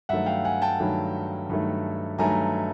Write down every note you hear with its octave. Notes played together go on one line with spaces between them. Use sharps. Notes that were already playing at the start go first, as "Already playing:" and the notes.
G2 D#3 F#3 A3 E5 F#5
F5 G5
F#5 G#5
G5 A5
G2 D#3 F#3 A3
G2 D#3 F#3 A3
G2 D#3 F#3 A3 G#5 A#5